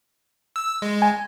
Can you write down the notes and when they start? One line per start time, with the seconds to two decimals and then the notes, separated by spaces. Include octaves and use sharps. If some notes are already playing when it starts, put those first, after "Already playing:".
0.56 E6
0.82 G#3
1.02 G#5